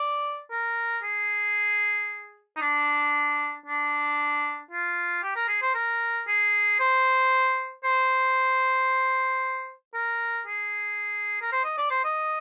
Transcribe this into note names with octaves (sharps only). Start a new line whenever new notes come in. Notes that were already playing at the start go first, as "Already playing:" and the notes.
Already playing: D5
A#4
G#4
D#4
D4
D4
F4
G4
A#4
G#4
C5
A#4
G#4
C5
C5
A#4
G#4
A#4
C5
D#5
D5
C5
D#5